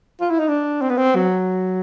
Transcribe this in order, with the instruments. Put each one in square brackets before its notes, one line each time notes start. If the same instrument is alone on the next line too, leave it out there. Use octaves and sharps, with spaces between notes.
[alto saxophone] F4
E4
D#4
D4
C4
B3
C4
F#3